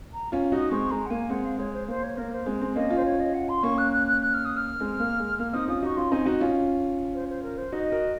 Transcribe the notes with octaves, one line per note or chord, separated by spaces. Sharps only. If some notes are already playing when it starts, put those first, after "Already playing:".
A#5
C#4 F4
D#4 F#4 D#6
G#3 C4 C#6
G#3 A#5
F#5
A#3 G#5
G#3 C4 F#5
F5
G#3 C#5
C5
A#3 C5
C#5
A#3 A#4
C5
G#3 C4
G#3 C4
A#3 C#4 D#5
C#4 F4
C5
C#5
D#5
F#5
C6
A#3 C#4 C#6
F#6
F#6
F#6
F#6
F6
D#6
F6
G#3 C4
A#3
G#3
A#3 F6
C4 D#4 D#6
C#4 F4 D#6
D#4 F#4 C#6
C#4 F4 C6
C4 D#4 G#5
D#4 F#4 D#5
C#4 F4
C5
C5
A#4
C5
D#4 F#4 D#5
F#4 A#4